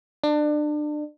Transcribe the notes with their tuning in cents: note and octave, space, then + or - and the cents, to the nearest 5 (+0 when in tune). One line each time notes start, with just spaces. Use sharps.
D4 +30